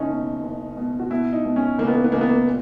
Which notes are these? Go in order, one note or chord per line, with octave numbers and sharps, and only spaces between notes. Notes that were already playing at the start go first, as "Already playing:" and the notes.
Already playing: F#1 C#4 D#4
B2
F#1
B2
F#4
B2 E4
D#4
B2
C#4
C#2 A#3
B3
A#3
B3
C#2 A#3
B3
A#3
A#2